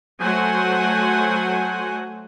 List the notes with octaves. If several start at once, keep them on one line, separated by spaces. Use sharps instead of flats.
F#3 A3 C5 F#5 G#5